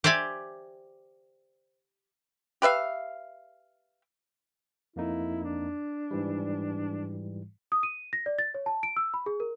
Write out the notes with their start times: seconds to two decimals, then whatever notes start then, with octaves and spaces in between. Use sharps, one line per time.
0.04 G4 C5 D5 E5 G#5
2.62 G4 B4 E5 F5
4.96 F2 A#3 D#4 E4
5.44 D4
6.11 G#2 E3 G3
7.72 D#6
7.83 D#7
8.13 A#6
8.26 D5
8.39 A6
8.54 C#5
8.66 A5
8.83 D7
8.96 E6
9.14 B5
9.26 G#4
9.40 A#4